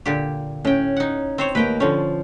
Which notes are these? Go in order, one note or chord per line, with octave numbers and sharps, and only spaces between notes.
A#2 D3 G4
A2 C#4 G5
D#4 F#5
C4 C5 C#5
D#2 A#3 B4 G5
D3 F3 C#4 A4 C5